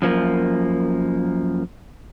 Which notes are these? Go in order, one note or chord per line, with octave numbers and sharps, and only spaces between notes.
F#2 F3 A#3